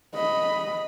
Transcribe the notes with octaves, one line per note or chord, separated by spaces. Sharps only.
D#5 B5